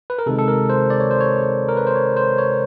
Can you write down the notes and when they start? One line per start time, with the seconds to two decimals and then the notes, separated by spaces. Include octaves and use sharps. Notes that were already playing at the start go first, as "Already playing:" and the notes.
0.10 B4
0.19 A#4
0.26 C3 D#3 G#3 A4
0.39 A4
0.48 A#4
0.69 C5
0.90 D5
1.00 C#5
1.11 C5
1.21 C#5
1.68 A#4
1.77 B4
1.87 C5
1.96 C#5
2.17 C5
2.38 C#5